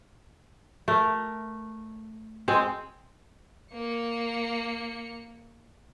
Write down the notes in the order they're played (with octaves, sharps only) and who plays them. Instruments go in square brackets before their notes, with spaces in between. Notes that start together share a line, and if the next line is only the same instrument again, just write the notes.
[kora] A3 A#4
G#3 C4
[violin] A#3 C#7